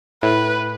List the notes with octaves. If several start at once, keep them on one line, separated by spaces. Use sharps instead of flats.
A2 B4